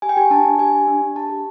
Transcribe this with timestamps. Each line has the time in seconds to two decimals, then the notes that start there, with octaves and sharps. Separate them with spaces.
0.02 G4 G#5
0.09 G5
0.17 G4 G#5
0.31 D4 A5
0.45 D4
0.58 G4 G#5
0.73 G4
0.87 D4
1.02 D4
1.15 G4 A5
1.30 G4